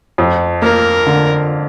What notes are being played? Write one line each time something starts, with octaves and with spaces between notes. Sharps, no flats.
F2
A#3 A#4
D3